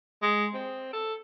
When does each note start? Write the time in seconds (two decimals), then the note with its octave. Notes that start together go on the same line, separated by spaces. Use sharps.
0.22 G#3
0.54 C4
0.93 A4